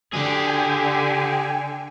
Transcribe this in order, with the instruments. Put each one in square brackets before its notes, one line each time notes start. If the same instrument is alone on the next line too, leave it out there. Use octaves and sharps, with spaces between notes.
[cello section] D3 [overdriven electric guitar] G4 G#4 [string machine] G5 G#5